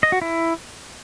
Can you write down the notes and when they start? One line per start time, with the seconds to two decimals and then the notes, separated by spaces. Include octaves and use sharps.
0.03 D#5
0.12 F#4
0.22 E4